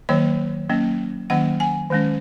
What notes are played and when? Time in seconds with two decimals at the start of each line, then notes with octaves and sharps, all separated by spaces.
0.09 D#3 F#3 A#3 C#5
0.70 F#3 A#3 C#4
1.30 D#3 F#3 A#3 C#4 F#5
1.60 G#5
1.90 D#3 G#3 C#4